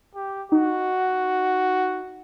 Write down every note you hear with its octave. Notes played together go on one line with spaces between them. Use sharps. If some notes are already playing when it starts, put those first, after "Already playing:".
G4
D#4 F#4